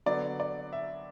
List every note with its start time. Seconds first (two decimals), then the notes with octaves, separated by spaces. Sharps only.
0.06 D3 F#3 B3 D5
0.40 D5
0.73 E5